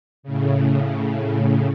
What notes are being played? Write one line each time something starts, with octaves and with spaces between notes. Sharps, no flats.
A2 C#3